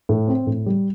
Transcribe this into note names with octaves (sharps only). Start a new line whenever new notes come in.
A2
C4
A2
G3